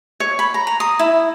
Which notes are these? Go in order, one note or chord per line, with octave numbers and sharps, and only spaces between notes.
C#5
B5
A#5
A#5
D#6
E4